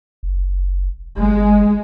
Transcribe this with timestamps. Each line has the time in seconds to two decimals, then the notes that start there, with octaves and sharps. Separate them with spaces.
0.23 F#1
1.17 G1 G#3